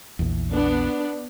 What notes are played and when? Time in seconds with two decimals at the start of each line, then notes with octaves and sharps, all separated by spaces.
0.19 A#1 E2
0.51 B3 D4